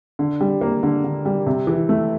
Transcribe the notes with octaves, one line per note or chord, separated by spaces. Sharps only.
D3
G3
A#3
D3
D3
G3
C3
E3
A3